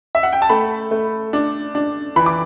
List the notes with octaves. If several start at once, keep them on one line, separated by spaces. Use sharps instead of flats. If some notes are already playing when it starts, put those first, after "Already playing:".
E5
F#5
G5
A5
A3 B5
A3
D4
D4
E3 B5
D6